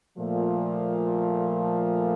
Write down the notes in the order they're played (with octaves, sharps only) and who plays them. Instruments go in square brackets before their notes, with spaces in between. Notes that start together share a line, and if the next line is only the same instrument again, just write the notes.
[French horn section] A#2 F3 A3